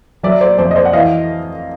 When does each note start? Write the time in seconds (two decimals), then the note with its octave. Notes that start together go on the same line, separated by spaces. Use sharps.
0.23 F#3 D5 E5
0.41 C5 D5
0.58 F2 C5 D5
0.71 D#5
0.76 C5 D5
0.85 F#5
0.93 E3 D#5 F5